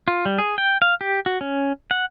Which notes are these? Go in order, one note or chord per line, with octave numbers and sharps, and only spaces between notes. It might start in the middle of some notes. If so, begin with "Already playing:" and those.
F4
G3
G#4
G5
F5
G4
F#4
C#4
F#5